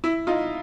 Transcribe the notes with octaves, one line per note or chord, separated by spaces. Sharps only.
E4
D#4 F4